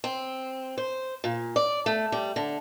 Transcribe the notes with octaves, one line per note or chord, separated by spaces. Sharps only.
C4
C5
A#2
D5
A3
G3
D3